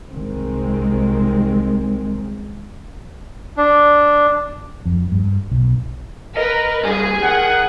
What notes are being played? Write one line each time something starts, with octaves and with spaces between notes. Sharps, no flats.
C2 D#3 G#3 C4
D4
F2
G2
B1
A#4 B4 D#5
C2 G2 G#4
D#3 F#5